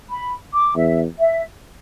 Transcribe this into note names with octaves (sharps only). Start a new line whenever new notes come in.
B5
D6
E2 E5
E5